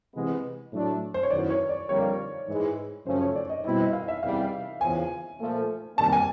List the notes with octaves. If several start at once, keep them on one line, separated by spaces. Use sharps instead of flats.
C3 E3 G#3 B3
A2 F#3 A3 D4
C5
C#5
F#2 D#3 F#3 B3 E4 D5
C#5
D5
F2 D3 G3 A#3 C#5
G#2 E3 G#3
F#2 C#3 F3 A3 C#4 C5
C#5
D5
D#5
B2 G3 C4 E4 D#5
D#5
F5
E5
E2 C3 E3 G3 F5
E2 C#3 F3 G#5
A#2 F3 A3
C3 D#3 G3 A#3 A5
G#5